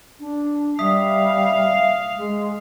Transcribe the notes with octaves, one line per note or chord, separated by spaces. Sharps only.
D4
G3 E5 F5 D#6 B6
G#3